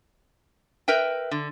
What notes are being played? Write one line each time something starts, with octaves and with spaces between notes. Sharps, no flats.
A#4 B4 E5 G5
D3